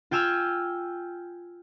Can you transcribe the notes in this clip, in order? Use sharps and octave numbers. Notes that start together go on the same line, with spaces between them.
F4 G5 G#5 E6 F6